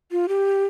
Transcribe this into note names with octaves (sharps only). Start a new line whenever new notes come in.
F4
G4